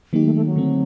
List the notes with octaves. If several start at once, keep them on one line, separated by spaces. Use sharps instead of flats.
D#3 F#3 A#3 D#4 G4
A3
A3
F#3
D3 A3 C4